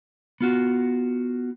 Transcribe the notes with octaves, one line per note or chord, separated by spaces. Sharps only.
B3 F4 F#4